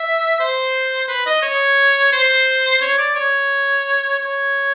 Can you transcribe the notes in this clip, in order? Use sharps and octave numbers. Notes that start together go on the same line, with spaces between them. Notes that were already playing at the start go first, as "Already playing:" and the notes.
Already playing: E5
C5
B4
D#5
C#5
C5
C#5
D5
C#5
C#5